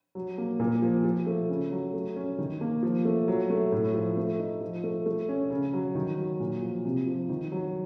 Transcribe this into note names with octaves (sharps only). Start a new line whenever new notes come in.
F#3
A#3
A#2
F3
F3
A3
C#3
F#3
A3
C#4
D#3
A#3
F3
A3
F#3
A3
A2
F3
A3
D#4
F3
A3
A3
C#4
C#3
F#3
D#3
F#3
A#2
F3
C3
F3
D#3
F#3